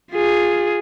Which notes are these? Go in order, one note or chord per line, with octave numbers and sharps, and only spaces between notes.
F4 G#4